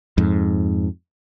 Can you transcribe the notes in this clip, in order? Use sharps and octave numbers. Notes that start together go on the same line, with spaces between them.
F2 G#2